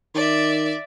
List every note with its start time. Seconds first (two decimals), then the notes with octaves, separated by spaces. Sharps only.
0.15 D#3 D5 E5